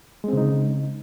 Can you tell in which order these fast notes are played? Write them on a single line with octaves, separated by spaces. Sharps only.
G#3 C4 C#3 D#4